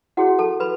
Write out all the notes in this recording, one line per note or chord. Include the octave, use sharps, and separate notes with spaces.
E4 F#4 G#4 C#5 F#5
A4 A5
B4 B5